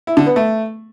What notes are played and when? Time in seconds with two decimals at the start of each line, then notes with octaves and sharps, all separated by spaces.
0.07 E4
0.17 D3
0.26 B3
0.36 A3